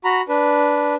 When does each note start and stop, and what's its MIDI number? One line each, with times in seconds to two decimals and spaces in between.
0.05 0.21 66
0.05 0.21 82
0.05 0.21 83
0.29 0.95 62
0.29 0.95 71